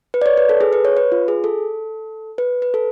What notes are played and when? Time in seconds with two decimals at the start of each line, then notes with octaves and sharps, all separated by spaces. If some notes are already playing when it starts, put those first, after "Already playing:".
0.14 B4
0.22 D5
0.26 C#5
0.37 B4
0.49 A4
0.61 G#4
0.73 B4
0.85 C#5
0.97 B4
1.12 F4
1.28 G#4
1.44 A4
2.38 B4
2.62 B4
2.74 A4